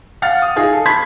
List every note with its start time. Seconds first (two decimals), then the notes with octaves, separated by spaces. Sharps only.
0.22 F5 F#5 F6 A6
0.42 D#6
0.56 D#4 F4 G#4
0.73 A4
0.86 A5 B5 C6 G#6 B6